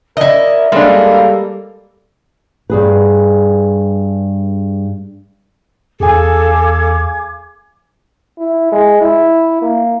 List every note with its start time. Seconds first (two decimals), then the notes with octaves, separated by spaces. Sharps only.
0.17 E4 A#4 D5 D#5
0.72 G3 G#3 A#3 D4 A4
2.70 G2 G#4 B4
6.00 E2 G#4 A4 F5 G#5 D6 G#6
8.38 E4
8.72 G#3
9.01 E4
9.62 A#3